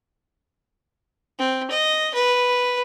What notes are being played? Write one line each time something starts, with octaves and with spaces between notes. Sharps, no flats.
C4
D#5
B4